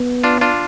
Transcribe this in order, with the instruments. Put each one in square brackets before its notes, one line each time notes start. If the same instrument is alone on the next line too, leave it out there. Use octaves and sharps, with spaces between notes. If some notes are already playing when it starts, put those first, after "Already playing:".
Already playing: [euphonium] B3
[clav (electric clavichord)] D4 F4
D4 F4